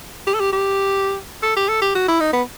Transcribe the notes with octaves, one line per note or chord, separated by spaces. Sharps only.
G4
A4
G4
G4
A4
G4
A4
G4
F#4
E4
D#4
B3